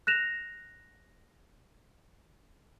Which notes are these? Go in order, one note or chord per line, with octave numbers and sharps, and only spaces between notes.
F#6 A#6 E7 F7